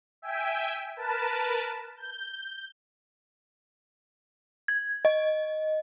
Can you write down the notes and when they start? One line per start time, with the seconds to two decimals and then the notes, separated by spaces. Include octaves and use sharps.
0.22 E5 G5 G#5
0.96 A#4 B4 A5
1.97 G6
4.68 G#6
5.05 D#5